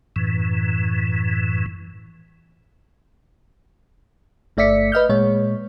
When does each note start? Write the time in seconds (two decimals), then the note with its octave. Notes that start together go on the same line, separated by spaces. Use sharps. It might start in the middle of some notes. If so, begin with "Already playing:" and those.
0.16 F#2 A2 E3
4.57 G1 A3 D5 E5 B6 C#7
4.92 B4 D#5 F6 G6
5.09 A#2 G#3 C#5